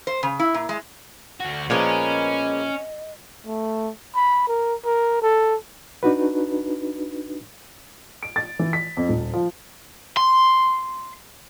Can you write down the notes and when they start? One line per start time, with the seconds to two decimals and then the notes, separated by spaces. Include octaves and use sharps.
0.07 C5
0.23 C#3
0.40 E4
0.54 A#2
0.69 G#3
1.40 D2 F#4 F#5
1.70 A#2 F3 G#3 A#3 B3 C#4 D#5
3.46 A3
4.15 B5
4.48 A#4
4.85 A#4
5.22 A4
6.03 D4 D#4 F#4 B4
8.23 D7
8.36 A6
8.59 E3
8.73 B6
8.97 F2
9.09 D#1
9.34 F3
10.17 C6